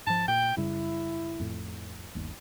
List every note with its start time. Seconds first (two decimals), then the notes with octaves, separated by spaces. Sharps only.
0.07 G#2 F3 A5
0.28 A#2 G5
0.57 F#2 C#3 G3 E4
1.40 F2 A2
2.15 G1 D#2